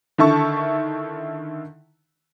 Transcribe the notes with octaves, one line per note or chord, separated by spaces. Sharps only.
D3 D#3 E4 A5 C#6